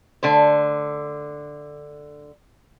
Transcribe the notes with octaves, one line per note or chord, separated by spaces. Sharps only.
D3 A3 C5